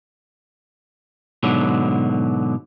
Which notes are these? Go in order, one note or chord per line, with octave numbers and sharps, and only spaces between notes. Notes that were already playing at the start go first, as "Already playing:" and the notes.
G#2 B2 D3 F#3